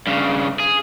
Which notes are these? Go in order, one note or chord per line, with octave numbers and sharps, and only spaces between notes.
G2 C#3
G#4